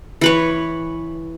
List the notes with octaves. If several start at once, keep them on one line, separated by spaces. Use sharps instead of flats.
E3 B4 C#5